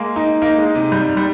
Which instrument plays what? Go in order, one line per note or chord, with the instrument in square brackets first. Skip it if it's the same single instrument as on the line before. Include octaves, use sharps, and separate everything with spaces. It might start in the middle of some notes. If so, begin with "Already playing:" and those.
Already playing: [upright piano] G#3 [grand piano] A#3
[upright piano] D#4
[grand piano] A#3 [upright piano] D#4
[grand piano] G#3
[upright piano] D#4
[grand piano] C3
[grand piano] G#2 [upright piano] G3
[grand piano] G#2
[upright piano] G3